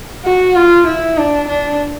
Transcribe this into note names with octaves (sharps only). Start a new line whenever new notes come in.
F#4
F4
E4
D4
D4